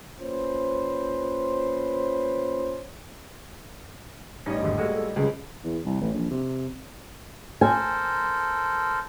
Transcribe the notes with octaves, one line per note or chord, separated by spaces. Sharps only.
A#3 C#4 F4 B4 C5
A1 G3 C#4 D#4 D#5
G#1 E2 D3
G#3 A#3 F#4 A4
A4
D#1 C#2 C#3 G#4
E2
C2
A1
A#1
C3
A4 A#4 C5 G#5